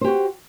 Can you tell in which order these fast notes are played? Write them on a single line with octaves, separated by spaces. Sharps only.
C5 G4 F#4